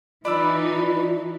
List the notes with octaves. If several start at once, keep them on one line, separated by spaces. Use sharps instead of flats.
E3 D4 D#4 F4 D5 B5 E6